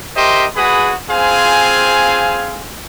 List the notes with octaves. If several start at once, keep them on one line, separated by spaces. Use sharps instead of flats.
G4 A#4 C5 D#5 E5 C6
G#3 F#4 G#4 B4 B5 D#6
C4 F4 G#4 C5 F5 G#5